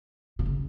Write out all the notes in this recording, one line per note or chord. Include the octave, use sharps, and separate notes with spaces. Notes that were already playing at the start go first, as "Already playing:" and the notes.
C3
C#3